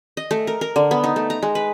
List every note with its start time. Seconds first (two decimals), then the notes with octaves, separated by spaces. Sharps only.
0.17 D#5
0.31 A3
0.47 A#4
0.61 A#4
0.76 D3
0.91 B3
1.04 D#4
1.16 A3
1.30 A#5
1.43 G#3
1.55 B4